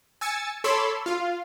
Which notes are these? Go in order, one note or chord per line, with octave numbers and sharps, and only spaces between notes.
G#5 E6 A6 C#7
A4 C#5 B5 C6 D6 E6
F4 F5